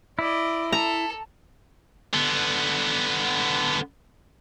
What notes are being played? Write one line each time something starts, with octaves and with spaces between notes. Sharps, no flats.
E4 D5 D#5
A4 A#5
D3 B3